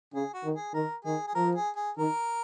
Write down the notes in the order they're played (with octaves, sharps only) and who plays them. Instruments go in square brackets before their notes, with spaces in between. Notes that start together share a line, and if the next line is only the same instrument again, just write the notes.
[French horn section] C#3 [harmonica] G#4
[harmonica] F#4
[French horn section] D#3
[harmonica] G#4
[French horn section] D#3 [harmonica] A#4
[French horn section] D#3 [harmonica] G#4
[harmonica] G#4
[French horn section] F3 [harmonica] A#4
[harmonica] G#4
G#4
[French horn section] D#3 [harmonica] A#4